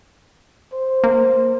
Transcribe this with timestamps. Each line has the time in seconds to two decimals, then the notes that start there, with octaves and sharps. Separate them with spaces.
0.73 C5
1.04 A#3